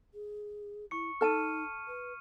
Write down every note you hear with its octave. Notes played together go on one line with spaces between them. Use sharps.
G#4
E4 C#6 C#7
D#4 A4 A5 F6 D#7
B4